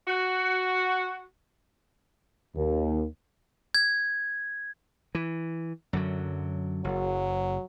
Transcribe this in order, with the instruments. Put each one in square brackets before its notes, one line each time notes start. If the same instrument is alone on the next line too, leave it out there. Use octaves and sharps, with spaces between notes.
[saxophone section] F#4
[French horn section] D#2
[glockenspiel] G#6
[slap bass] E3
F#2 D3 F#3
[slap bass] F#1 [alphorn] F#3